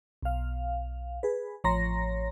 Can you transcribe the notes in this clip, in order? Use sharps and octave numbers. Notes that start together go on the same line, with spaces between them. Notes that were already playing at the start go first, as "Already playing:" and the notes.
B1 F5
G#4 B4
A1 F3 C#5 A#5 C6 A#6